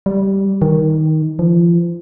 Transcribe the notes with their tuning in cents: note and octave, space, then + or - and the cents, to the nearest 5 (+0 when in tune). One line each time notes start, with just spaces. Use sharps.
G3 -10
D#3 +10
F3 -35